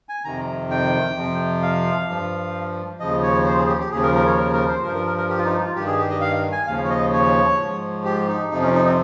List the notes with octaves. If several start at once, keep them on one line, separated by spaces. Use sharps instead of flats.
G#5
F2 C3 D#3 A#5
G5
F2 C3 F3
F5
G2 F3
D#2 C#3 F3 D#5
C#5
C5
G#4
G4
G4
D#2 C#3 F3 G#4
A#4
A#4
C#5
A#4
A#4
C5
G2 F3 A#4
A#4
A#4
A#4
G4
F4
D#4
F4
G2 D#3 G4
G#4
G4
D#5
F5
G#5
D#2 C#3 F3 F5
C#5
D#5
C#5
G#2 F3
G4
D#4
F2 C3 F3 D#4
C#4
D#4
C4